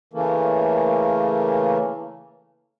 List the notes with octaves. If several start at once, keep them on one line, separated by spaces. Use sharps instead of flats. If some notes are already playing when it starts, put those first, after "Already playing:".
C#3 E3 A3 A#3